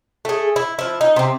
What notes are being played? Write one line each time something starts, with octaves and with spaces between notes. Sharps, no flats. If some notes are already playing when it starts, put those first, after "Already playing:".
A3 G#4
E4
F3 E4
D#4
C3 C4